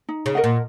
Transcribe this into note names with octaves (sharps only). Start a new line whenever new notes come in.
D#4
C#3
A#4 D#5 F#5
A#2